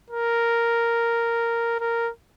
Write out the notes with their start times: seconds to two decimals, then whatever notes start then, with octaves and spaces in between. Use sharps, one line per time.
0.11 A#4
1.81 A#4